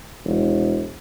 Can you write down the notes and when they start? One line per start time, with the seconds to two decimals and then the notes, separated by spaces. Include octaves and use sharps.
0.25 E1